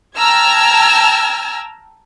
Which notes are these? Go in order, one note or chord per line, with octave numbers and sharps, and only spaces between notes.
G5 A5 A#5 E6 F6 G#6